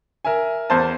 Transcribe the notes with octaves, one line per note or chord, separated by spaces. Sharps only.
A#4 E5 G#5
E2 C5 A5